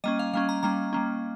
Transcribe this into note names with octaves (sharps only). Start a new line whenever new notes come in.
G3 A#3 C#4 D#5
F5
G3 A#3 C#4 F5
A#5
G3 A#3 C#4 A#5
G3 A#3 C#4